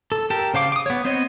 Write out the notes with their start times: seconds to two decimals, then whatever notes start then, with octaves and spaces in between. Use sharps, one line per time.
0.12 A4
0.30 G4 A#4 A5
0.54 C#3 C5 F5 D6
0.72 D6 D#6
0.86 B3 C#5
1.04 B3 C4 C5 C#5 D#5